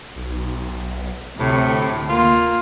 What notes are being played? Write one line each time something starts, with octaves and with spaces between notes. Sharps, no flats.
B1
D2 A2 C3
A#3 F4